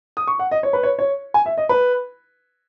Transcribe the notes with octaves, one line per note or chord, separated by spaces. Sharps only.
D#6
C#6
F#5
D#5
C#5
B4
C#5
C#5
G#5
E5
D#5
B4